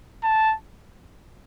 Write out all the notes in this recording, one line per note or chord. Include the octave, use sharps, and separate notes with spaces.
A5